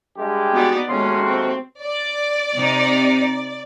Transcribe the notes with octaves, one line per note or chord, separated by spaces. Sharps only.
G2 G#3 G4
B3 D#4 F#4 D5
D#2 G#3 A3 C#4 F#4 C6
C4
D5
C3 D#4